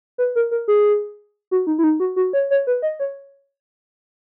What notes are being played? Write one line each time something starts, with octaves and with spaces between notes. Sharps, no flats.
B4
A#4
A#4
G#4
F#4
D#4
E4
D#4
F#4
F#4
C#5
C#5
B4
D#5
C#5